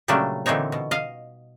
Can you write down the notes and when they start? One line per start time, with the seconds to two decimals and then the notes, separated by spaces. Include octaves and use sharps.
0.08 A#2 C#3 F#3 G3 A3 D4
0.46 A#2 D3 E3 C4 D#4 C#5
0.72 B2
0.91 D#5 F5